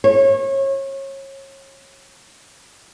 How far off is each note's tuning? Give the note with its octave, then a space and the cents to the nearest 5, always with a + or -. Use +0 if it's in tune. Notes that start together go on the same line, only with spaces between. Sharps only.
C#5 -30